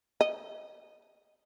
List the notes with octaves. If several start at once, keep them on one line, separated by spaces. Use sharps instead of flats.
D#5